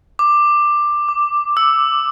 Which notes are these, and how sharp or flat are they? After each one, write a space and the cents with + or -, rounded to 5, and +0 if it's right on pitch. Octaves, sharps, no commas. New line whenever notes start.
D6 +10
D6 +0
E6 +0